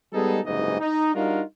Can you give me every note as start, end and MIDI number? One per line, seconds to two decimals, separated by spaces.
0.13 0.40 55
0.13 0.40 56
0.13 0.40 59
0.13 0.40 63
0.13 0.40 68
0.13 0.40 69
0.45 0.79 30
0.45 0.79 36
0.45 0.79 44
0.45 0.79 52
0.45 0.79 63
0.45 0.79 75
0.80 1.11 63
1.15 1.42 55
1.15 1.42 62
1.15 1.42 63
1.15 1.42 65
1.15 1.42 66
1.15 1.42 70